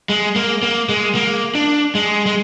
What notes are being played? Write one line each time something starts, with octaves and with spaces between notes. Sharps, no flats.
G#3
A#3
A#3
G#3
A#3
D4
G#3
G#3